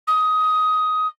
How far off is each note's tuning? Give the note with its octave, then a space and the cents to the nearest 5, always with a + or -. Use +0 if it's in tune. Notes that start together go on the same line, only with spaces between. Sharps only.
D#6 +15